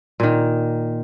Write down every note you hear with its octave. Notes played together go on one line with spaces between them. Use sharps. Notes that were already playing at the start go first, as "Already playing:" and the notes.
A#2 D#3